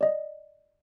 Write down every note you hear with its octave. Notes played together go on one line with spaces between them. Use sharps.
D5 D#5